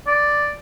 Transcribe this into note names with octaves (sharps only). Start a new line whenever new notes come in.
D5